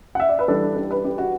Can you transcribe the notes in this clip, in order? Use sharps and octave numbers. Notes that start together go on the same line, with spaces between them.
F#5
E5
D5
B4
E3 G3 D4 A4
G4
B4
G4
F#4